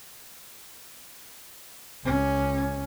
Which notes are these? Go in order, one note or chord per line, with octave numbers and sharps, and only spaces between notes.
C#2 C#4